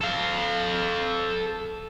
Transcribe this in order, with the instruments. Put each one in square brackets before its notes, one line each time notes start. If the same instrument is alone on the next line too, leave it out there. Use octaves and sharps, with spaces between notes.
[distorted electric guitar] A4 F5